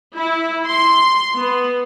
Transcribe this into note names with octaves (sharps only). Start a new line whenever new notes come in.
E4
C6
B3